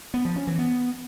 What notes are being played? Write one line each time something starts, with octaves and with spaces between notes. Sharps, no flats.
B3
F3
C#4
E3
B3